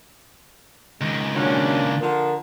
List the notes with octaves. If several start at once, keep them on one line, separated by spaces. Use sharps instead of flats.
C#2 D#3 G#3
A#2 F#3 A#3 C#4 D4
D3 F3 A#4